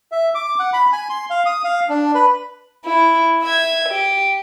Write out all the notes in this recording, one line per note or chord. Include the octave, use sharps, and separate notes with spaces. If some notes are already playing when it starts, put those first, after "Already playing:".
E5
D6
F#5
B5
G#5
C6
F5
D#6
F5
D4
B4
E4
E5 G#6
G4